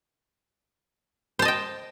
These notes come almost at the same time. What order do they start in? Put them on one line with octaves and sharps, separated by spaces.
C5 A5 D#5 G5